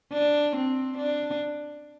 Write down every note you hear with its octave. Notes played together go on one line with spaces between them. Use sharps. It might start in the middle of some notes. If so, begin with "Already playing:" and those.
D4
C4
D4